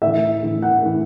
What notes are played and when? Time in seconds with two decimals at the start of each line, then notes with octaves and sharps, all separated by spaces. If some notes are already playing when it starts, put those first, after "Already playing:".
0.02 A2 E3 E5
0.43 A2 E3
0.62 F#5
0.83 A2 E3